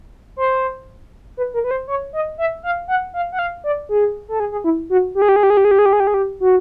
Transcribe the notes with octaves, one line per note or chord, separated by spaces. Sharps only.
C5
B4
A#4
B4
C5
C#5
D#5
E5
F5
F#5
F5
F#5
F5
D5
G#4
A4
G#4
G#4
E4
F#4
G4
G#4
G4
G#4
G4
G#4
G4
G#4
G4
G#4
G4
G#4
G4
G#4
G4
F#4